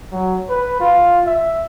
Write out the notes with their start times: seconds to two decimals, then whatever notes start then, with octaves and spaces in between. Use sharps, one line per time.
0.12 F#3
0.49 B4
0.80 F4
1.26 E5